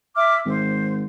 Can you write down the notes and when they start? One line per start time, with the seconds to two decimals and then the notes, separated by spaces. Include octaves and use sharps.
0.15 E5 D6 F6
0.45 G#1 C5